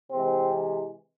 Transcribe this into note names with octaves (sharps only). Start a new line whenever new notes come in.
C3 E3 G#3 C4